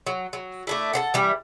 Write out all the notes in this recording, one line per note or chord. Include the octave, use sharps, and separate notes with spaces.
F#3
F#3
A3 D4 E4
A4 C5 F#5
E3 G3 E4